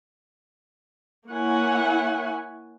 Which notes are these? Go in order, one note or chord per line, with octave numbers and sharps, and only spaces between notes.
A#3 E4 C#5 F#5 G#5